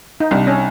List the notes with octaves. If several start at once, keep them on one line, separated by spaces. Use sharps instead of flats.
D#4
C2 D4
C#4